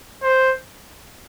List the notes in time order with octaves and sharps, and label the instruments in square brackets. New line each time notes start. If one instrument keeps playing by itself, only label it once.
[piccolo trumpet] C5